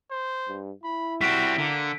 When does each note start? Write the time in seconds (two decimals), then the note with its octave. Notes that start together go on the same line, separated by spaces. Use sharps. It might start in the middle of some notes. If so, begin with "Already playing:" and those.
0.11 C5
0.48 G2
0.84 E4 B5
1.21 G3 C4 F#4 B6 D7
1.58 D3 A#3